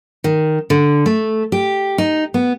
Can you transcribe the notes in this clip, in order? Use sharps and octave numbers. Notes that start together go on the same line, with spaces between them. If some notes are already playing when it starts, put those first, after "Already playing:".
D#3
D3
A3
G4
D#4
B3